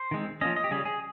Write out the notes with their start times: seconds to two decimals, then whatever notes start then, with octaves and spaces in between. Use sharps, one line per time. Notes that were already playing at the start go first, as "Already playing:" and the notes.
Already playing: C5
0.11 D#3 G#3 C4
0.41 F3 A#3 C#4 D#5
0.56 D#5
0.64 G4
0.71 C#3 G3 C#4 G#4
0.85 G#4